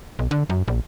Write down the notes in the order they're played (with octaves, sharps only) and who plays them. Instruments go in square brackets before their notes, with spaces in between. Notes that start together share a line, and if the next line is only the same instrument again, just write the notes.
[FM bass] B1
D3
F#2
A#1